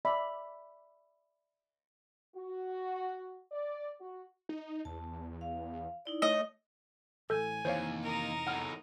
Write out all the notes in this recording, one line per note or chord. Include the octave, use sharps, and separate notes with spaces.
D5 E5 B5
F#4
D5
F#4
D#4
E2 A5
F5
D#4 E4 D5
A3 C#5 D#5
A1 A2 A4 G#5 G6
F1 D#2 C3 E3 C5 C#5 F5
D#4 A#4
E2 A2 F#5 F6